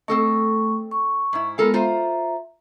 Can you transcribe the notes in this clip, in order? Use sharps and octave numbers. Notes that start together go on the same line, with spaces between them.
A3 C4 A4 D#5 C#6
C#6
G#2 E4
G#3 B3 F4 A4 A#4
F4 C5 E5 A#5